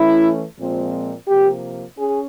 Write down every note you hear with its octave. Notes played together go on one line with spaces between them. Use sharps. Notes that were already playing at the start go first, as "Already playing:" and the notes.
Already playing: E3 A3 C#4 E4
A#2 F3 G#3 C4
C3 F3 A#3 G4
C#4 G#4